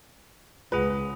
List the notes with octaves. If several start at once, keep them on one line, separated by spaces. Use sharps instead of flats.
C#2 F4 G#4 B4 F#5